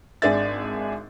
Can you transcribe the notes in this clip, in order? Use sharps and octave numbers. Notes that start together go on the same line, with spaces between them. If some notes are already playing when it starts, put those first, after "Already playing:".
G#1 D4 G#4 D5 E5 A6